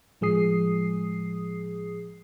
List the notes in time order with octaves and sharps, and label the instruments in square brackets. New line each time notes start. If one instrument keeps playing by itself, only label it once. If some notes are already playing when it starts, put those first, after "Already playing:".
[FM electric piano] A2 F3 G#3 G#4 D#6 C7